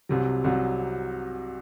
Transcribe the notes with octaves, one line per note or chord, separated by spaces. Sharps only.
C2 C3 F#3
C2 C3 F#3